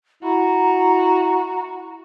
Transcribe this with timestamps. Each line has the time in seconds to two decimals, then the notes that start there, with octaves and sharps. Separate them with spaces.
0.23 E4 F#4 A#5